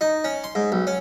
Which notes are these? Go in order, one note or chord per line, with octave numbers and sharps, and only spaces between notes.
D#4
C#4
C6
G#2
B1
C#4